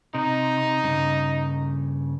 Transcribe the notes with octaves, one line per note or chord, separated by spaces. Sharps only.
C3 D#4
G2 C#3